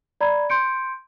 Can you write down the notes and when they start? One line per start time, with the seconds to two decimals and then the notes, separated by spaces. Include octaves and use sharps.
0.21 D5 A#5 B5 G#6
0.50 C6 G6 C#7 D7